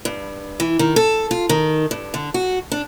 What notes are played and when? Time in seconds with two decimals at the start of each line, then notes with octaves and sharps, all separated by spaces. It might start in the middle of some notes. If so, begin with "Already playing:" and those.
0.05 G2
0.60 E3
0.79 D#3
0.96 A4
1.31 F4
1.49 D#3
1.91 G2
2.14 D3
2.34 F#4
2.72 D4